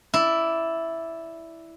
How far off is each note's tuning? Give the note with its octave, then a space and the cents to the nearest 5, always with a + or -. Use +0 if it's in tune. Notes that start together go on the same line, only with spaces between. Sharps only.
E4 +0 D5 +0